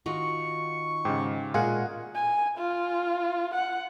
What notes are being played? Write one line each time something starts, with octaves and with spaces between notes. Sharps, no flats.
D#3 F4 F#4 C#6
G#2 C#3 G4
A#2 G#3 F4 F#4 G#4 A#4 F#5 G#5
G#5
F4
F#5